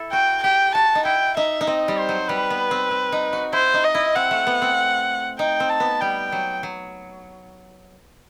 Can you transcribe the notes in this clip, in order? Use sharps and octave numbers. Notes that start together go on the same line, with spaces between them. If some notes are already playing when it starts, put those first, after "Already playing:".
Already playing: E4 A4
F#4 G5
G4 G5
F#4 A5
D#4
E4 G5
D#4 E5
D#4
C4 D#5
G3
C5
F#3
G3 B4
B3
C4
C4
D#4
F#4
E4 C5
D#4
D#5
E4
C4 F#5
A3
B3
C4
D#4 G5
C4
A5
B3
G3 G5
F#3
F#3